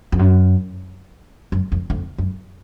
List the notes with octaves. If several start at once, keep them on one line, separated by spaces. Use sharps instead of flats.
F2
F#2
F#2
F2
F2
F#2